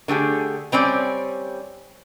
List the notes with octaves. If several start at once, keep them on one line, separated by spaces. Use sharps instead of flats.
D3 A3 G4 G#4
G3 C4 C#4 D5